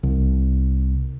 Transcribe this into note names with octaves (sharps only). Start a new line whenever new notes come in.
C2